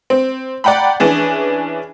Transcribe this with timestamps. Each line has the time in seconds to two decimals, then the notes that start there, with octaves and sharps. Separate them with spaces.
0.10 C4
0.64 D5 F#5 G5 A#5 B5
1.00 E3 C#4 D4 G#4